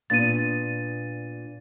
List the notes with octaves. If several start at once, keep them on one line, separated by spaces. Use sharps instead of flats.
A#2 B3 D4 A6 D#7